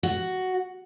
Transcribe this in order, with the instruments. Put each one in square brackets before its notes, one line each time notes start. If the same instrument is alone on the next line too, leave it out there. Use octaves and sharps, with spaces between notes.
[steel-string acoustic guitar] F#4